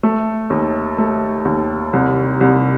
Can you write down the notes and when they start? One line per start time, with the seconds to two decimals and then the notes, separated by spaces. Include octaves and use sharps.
0.03 A3
0.50 D#2
0.98 A3
1.45 D#2
1.93 C2
2.41 C2